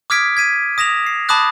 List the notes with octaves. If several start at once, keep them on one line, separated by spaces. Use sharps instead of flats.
D6 D#6 F6 G#6 B6 D7
G#6 B6 D#7
D#6 A#6 E7 F7
C7
A5 B5 D6 D#6 F#6 A6